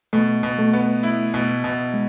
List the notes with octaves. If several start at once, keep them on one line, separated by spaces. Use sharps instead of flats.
B2 A3
B2
A3
B3
E4
B2
B2
G#3